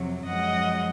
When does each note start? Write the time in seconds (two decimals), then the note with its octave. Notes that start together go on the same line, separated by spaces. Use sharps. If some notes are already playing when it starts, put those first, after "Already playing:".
Already playing: F2 C3 F#3
0.26 F#2 F3 G#3 D#5 F#5